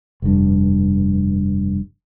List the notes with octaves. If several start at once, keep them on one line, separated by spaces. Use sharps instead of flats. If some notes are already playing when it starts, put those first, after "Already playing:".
F1 G2